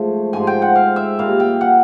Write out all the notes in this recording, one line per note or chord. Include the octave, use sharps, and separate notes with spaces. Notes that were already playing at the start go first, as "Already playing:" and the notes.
Already playing: G#2 F3 A3
G#2 F3 G#3 G#5
G5
F#5
F5
E5
A#2 G3 A#3 F5
G5
F#5